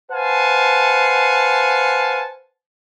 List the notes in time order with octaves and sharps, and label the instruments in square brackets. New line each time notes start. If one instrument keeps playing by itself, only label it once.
[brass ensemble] B4 C5 F5 F#5 G#5 A5